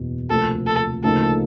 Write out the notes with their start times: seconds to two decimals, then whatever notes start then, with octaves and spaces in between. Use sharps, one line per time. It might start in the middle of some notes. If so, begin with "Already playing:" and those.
Already playing: F#1 E2 B2
0.30 D2 C3 F3 A#3 A4
0.67 A4
1.03 D2 C#3 F3 A#3 D#4 A4